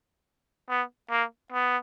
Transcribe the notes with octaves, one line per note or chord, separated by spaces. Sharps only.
B3
A#3
B3